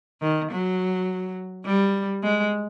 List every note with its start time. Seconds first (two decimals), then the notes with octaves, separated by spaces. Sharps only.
0.22 D#3
0.51 F#3
1.66 G3
2.23 G#3